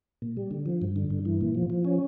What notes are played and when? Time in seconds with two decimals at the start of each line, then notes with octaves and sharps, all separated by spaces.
0.22 A#2
0.37 G3
0.51 D3
0.66 F3
0.82 G2
0.96 D3
1.10 G2
1.25 E3
1.41 A#2
1.55 F3
1.70 F3
1.85 C#4